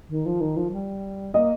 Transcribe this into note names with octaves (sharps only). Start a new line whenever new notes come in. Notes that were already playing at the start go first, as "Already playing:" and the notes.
D#3
F3
D#3
F3
G3
A#3 D#5